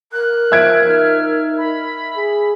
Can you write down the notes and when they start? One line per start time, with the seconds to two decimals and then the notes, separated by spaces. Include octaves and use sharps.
0.13 A#4 F#6
0.52 F3 E5 G#6 D7
0.88 D#4 F6
1.58 B5
2.16 G#4